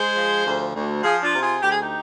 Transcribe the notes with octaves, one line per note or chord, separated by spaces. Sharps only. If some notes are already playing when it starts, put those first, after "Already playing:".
Already playing: G#3 G#4 C5
F3
D2
D2
F3 F4 G#4
D4 F4
C3
F4 G#4
D2 G4
G#4
D#4 G4